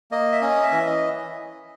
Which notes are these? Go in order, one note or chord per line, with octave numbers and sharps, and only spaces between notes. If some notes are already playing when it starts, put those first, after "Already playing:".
A#3 D#5
E5
C#4 D#5
E5
E3
D#5